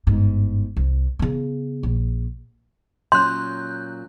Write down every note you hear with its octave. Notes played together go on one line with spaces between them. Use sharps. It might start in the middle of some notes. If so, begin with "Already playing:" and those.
G1 G#2
C2
C#3 B3
A#1
A#2 F#3 C#4 C6 F#6 G6